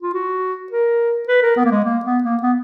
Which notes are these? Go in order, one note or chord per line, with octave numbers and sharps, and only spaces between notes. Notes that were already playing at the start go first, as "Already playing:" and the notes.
F4
F#4
A#4
B4
A#4
B3
A#3
G#3
A#3
B3
A#3
B3